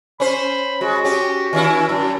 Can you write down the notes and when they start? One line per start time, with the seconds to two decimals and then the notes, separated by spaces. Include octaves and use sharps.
0.20 C#4 C5 B5
0.81 G#3 F#4
1.05 C#4 G4
1.53 D#3 C#4 E4
1.89 F#2